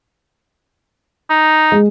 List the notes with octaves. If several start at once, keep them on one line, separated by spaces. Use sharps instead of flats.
D#4
G#3